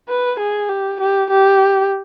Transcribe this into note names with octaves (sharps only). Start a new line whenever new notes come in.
B4
G#4
G4
G4
G4